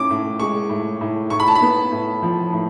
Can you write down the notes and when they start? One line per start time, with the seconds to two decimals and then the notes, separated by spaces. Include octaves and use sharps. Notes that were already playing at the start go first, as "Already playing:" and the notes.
Already playing: A2 C#4 D6
0.10 A2
0.40 G#3 C#6
0.70 A2
1.01 A2
1.30 A2 C#6
1.40 B5
1.48 A5
1.55 B5
1.62 B3
1.92 A2
2.23 F3
2.53 A2